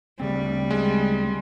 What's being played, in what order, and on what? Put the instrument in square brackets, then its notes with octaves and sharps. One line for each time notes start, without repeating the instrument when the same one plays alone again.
[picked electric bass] D2 C#3 C4 [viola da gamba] G3
[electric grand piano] G#3